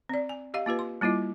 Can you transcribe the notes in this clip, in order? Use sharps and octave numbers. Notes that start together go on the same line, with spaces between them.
C4 D5
G#5
G4 D#5 F5
A#3 F4 G4 B4
C6
G3 A#3 E4 F4 D#5